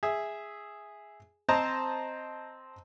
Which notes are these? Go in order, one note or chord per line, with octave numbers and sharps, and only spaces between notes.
G#4 E5
C4 C5 D#5 A5 A#5